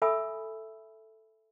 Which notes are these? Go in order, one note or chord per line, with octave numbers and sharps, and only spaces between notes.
A4 E5 G#5 B5 D#6 E6